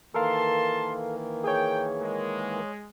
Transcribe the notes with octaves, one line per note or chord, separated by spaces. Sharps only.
D#3 E3 A#3 A4 A#4 F5 A5 C6
G#4 C#5 G5
G#3